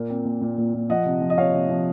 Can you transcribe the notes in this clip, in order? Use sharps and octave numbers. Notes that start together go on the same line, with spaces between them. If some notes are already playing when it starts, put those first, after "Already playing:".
Already playing: A#2 A#3
C4
A#2
A#2
A#2
A#2
F3 D#5 F#5
C3
F3
D#5
C3 C#5 F5
C3
F3